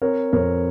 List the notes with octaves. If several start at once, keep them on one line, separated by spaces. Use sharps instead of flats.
C4 A#4 C#5
F2 A#4 C#5